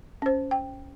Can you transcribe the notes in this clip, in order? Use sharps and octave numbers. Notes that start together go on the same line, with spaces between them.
C#4 C5
G5